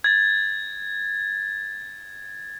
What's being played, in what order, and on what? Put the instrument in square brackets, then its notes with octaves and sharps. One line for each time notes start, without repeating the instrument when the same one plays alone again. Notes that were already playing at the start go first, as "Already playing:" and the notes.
[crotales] G#6 A6